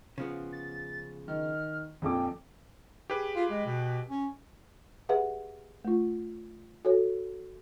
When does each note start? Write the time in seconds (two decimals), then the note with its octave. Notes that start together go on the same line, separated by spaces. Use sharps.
0.18 C#3 F3 B3
0.52 A6
1.28 D#3 F6
2.02 A#1 F2 A4 G5 D6
3.10 G4 G#4 B4
3.36 F4
3.50 G#3
3.66 B2
4.10 C#4
5.09 G4 G#4 B4 E5 F#5
5.85 A3 F4
6.85 F#4 A4 C#5